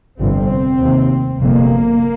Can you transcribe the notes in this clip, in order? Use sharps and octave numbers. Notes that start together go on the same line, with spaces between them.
G1 F2 C3 C4
F1 D#2
G1 F2 C3 A#3